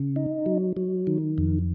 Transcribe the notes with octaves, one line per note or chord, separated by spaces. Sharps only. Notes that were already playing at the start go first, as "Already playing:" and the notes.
Already playing: C#3
D#4
F#3
F#3
D#3
F2